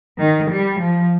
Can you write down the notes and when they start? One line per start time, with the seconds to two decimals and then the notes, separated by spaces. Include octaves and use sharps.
0.19 D#3
0.51 G3
0.82 F3